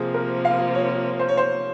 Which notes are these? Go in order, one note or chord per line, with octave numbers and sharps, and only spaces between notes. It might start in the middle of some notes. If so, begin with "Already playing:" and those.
Already playing: C3 F3 A#3 G#4
A#4
F5
C#5
C5
C#5
C5